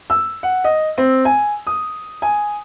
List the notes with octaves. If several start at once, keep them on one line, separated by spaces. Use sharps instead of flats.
E6
F#5
D#5
C4
G#5
D#6
G#5